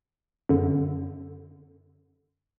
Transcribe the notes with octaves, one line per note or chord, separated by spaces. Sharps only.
F#2 D3